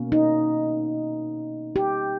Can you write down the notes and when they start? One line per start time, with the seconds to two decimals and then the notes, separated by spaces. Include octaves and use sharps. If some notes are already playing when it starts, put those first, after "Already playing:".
Already playing: B2 A#3 C#4
0.12 D#4
1.76 G4